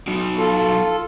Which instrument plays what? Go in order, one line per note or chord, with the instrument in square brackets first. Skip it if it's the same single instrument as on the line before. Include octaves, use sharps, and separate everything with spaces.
[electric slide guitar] F#3 D#4 F#4
[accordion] F4 A4